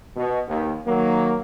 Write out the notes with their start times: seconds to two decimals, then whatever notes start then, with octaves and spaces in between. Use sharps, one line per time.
0.15 B2
0.47 D#2
0.86 D#3 F#3 A#3